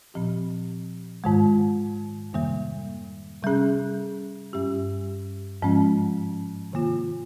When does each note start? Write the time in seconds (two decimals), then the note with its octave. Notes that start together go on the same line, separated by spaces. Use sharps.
0.14 A#2 F3 C4 G4
1.24 G#2 D#3 G#3
2.33 F2 C3 D#3 G3 A#3
3.43 C3 G3 C#4 G#4
4.53 G2 G3 C#4 G4
5.62 G#2 F3 G#3 C#4
6.72 C3 D#3 A#3 F4